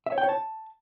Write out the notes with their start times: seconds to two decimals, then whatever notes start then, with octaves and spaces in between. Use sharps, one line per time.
0.06 E5
0.12 C#5
0.18 G5
0.23 C#5
0.29 A5